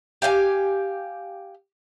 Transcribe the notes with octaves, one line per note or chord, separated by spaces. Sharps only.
G4 F5 G5 G#5